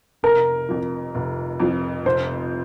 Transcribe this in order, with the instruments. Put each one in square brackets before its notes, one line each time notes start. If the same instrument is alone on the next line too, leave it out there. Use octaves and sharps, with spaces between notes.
[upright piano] F1 [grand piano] A#4
[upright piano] F2 F3
F1
F2 F3
[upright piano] F1 [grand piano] C5